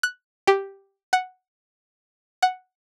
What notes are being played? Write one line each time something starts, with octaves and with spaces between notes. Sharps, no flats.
F#6
G4
F#5
F#5